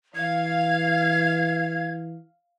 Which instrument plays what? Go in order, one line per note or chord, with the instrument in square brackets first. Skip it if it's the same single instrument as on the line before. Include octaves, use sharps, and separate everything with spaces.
[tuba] E3 [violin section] F5 [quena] G#6